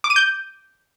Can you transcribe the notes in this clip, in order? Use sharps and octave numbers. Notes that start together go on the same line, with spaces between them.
D6
D#7
G6